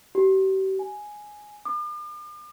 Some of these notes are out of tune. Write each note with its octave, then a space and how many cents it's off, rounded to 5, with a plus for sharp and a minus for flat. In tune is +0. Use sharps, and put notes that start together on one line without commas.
G4 -40
G#5 +5
D6 +45